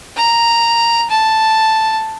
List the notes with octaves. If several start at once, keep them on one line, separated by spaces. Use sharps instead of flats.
A#5
A5